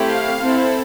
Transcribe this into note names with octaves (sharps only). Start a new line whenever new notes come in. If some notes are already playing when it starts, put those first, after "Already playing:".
Already playing: A3 C4 E4 G4
F5
C4 E4 A4